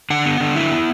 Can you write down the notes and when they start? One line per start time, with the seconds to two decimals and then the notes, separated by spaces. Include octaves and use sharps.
0.10 D3 F#5
0.26 B3
0.40 D3
0.56 E4 E5
0.71 B3